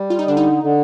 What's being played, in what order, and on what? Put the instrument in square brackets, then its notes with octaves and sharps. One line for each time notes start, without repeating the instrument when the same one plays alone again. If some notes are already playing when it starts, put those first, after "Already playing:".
Already playing: [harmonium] G3
[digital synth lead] F4
D#4
[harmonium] D3 [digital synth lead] D4
[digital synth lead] D#4
[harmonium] D3